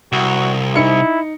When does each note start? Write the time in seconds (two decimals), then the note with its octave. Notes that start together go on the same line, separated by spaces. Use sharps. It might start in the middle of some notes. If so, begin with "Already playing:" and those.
0.12 C2 F#4
0.75 D#4 E4 C#7